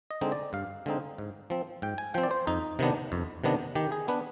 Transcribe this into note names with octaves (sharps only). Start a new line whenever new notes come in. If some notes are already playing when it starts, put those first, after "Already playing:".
D#5
D3 G#3 C4 D#4
D5
G2 F5
D3 G#3 C4 D#4
G#2
F3 C4
G#2 G5
G#5
F3 C4 G5
D5
C5
F2 D#4
C3 D#3 B3 D4
F2
C3 D#3 B3 D4
D#3 G4
G#4
B3 D4 B4